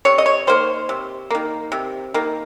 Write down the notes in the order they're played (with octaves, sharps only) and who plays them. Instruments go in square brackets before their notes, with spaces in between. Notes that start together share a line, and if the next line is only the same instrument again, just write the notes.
[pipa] C3 C#5
D#5
C#5
D#3 A#3 C5
C3
D#3 A#3
C3
D#3 A#3